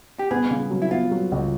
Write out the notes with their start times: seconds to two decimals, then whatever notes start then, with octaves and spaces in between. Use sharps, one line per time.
0.19 G4
0.31 B3 G#4
0.51 C#3
0.71 F#3
0.82 E4
0.91 B3 F4
1.11 F#3
1.32 C#2